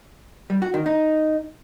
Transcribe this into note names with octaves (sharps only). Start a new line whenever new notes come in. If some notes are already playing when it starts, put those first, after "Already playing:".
G3
F#4
D#3
D#4